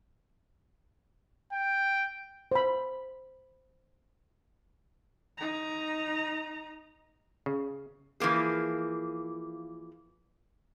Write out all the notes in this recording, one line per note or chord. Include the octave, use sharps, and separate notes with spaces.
G5
C5 B5
D#4 A#5
C#3
E3 F3 A#3 G#4